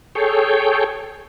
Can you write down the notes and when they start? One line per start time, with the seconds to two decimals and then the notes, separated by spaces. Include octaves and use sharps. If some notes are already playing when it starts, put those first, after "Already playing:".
0.15 G#4 A4 C#5 G5